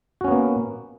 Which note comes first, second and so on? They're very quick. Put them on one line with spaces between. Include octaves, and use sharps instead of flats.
F#4 C#4 B3 A#3